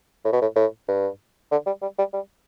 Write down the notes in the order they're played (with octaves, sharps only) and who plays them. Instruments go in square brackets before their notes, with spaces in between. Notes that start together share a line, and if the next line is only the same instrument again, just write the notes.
[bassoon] A2
B2
A2
A2
G2
D3
G3
G3
G3
G3